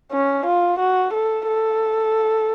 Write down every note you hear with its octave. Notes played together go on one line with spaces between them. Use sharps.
C#4
F4
F#4
A4
A4